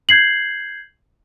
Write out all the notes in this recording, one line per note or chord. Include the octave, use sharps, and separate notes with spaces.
G6 G#6 C7 F#7